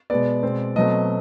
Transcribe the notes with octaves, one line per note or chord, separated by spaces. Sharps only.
B2 G#3 B3 D5
B2 G#3 C4
B2 F#3 A3 C4 D#5